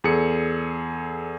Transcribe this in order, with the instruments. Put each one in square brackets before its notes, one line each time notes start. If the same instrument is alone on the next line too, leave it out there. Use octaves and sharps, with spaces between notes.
[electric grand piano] E2 G#4 A4 C#7